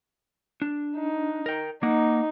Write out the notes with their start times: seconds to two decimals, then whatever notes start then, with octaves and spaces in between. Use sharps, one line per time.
0.62 D4
0.97 D#4
1.46 A#4 G5
1.83 A#3 D#4 F#5